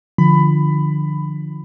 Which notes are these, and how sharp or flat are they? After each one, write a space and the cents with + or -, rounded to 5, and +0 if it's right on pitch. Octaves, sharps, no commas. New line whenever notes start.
D3 +25 F3 -5 B5 +15